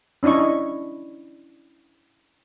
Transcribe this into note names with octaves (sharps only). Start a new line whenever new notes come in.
C#4 D4 E4 D#5 C#6